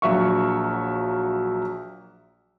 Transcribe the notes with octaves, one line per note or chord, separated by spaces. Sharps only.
A#1 F#3 E5 F5 C#6